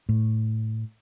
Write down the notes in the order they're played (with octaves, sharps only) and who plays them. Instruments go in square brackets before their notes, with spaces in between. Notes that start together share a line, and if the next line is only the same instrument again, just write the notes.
[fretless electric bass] A2